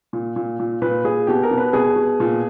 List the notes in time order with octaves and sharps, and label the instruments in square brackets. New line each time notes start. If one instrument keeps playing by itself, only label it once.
[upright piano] A#2
A#2
A#2
A#2 B4
A#2 G#4
B2 G4
A#4
B2
B4
B2 G#4
B2
A#2